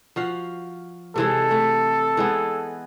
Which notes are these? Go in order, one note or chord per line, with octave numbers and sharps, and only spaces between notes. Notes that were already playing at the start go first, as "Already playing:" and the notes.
F3 F#4 F5
C3 E3 G#3 A4
A3
E3 G#3 B3